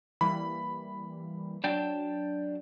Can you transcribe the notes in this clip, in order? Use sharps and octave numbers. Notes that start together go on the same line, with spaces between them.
E3 G3 A#3 B5
F#3 D4 G5 A5